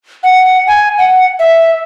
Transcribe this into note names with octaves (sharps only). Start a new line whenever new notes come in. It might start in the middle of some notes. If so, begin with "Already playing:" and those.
F#5
G#5
F#5
E5